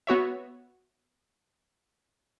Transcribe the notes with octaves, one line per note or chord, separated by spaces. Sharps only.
B3 F#4 C#5 E5